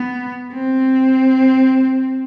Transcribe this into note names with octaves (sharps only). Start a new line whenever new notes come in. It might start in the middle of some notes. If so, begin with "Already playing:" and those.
Already playing: B3
C4